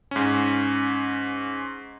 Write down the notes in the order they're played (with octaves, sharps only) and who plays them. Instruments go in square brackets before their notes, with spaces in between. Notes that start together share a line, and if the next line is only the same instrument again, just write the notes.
[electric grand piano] G#2 C#4